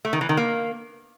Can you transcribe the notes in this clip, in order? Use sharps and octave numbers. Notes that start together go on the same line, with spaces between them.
A3
D#3
E3
D#3
A#3